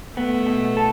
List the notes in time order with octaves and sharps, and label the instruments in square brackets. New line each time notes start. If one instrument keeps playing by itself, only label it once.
[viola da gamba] A3 [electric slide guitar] B3
[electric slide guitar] B2
A4